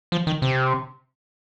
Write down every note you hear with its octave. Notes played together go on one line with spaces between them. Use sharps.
F3
D#3
C3